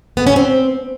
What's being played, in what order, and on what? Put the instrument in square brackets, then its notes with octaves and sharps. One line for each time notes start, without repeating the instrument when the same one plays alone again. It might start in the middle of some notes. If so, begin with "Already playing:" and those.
[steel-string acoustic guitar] B3
C#4
C4